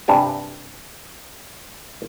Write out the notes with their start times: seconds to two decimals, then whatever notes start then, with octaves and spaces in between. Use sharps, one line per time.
0.08 G2 C3 D4 G4 G#5